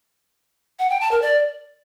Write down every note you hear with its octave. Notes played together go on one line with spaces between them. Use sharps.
F#5
G5
A5
A#4
D5